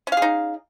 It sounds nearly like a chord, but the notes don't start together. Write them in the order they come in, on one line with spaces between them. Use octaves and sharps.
C#4 F5 G#4 D#4